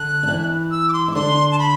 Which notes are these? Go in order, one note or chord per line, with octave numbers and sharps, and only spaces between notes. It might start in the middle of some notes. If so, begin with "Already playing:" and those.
Already playing: D3 F#6
D4
E3 E4
E6
D6
C6
E4
D6
D3 D4 C6
A5
B5